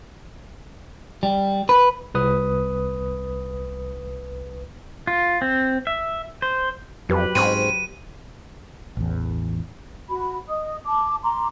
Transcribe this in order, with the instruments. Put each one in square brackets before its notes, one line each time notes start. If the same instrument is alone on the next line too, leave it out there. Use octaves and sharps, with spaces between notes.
[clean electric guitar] G3
B4
[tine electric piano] C2 B4 D#6
[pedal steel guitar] F4
C4
E5
C5
[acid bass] F2 [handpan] F#3 G4 B4
[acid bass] G#2 [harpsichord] C4 C#4 [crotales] D#7
[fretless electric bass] A1 E2
[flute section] F#4 B5
D#5 D#6
A5 D6
A#5 C6 D6